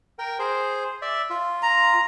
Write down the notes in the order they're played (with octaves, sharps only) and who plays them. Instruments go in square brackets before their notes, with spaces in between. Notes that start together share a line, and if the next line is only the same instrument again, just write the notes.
[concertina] A#4 G5
G#4 C5
D5 E5
F4
[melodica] A#5